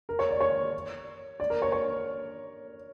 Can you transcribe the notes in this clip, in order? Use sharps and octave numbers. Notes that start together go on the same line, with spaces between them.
A#4
C#5
D5
C#5
D5
A#4
C#5
C#5